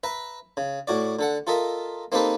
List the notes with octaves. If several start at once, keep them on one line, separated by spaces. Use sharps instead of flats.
B4 E5 A#5
C#3
A2 F#4 D5
D3 A4 F#5
F4 A4 A#4 D#5 E5
A#3 C4 D#4 G4 A4 B4